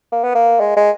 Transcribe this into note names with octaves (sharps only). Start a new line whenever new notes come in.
A#3
B3
A#3
G#3
G#3